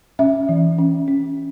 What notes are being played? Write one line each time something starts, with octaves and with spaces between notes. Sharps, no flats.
C#4 E5
E3
C#4
C#4